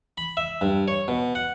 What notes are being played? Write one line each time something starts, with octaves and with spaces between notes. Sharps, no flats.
B5
E5
G2
C#5
B2
F#5